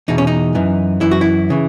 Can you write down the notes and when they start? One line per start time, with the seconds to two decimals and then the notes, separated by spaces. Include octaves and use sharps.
0.08 E2 B2 D#4
0.18 C#4
0.27 D#4
0.55 F#2 E3
1.01 F#2 E3 E4
1.11 F#4
1.21 E4
1.50 C#3 E3